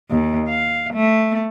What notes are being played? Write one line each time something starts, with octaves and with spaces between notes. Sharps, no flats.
D#2
F5
A3